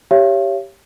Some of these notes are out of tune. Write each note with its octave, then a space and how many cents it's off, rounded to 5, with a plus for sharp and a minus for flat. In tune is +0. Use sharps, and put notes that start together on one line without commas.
G4 +0 C#5 +0 F5 -45